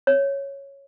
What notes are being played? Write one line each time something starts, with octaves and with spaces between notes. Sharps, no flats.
C#5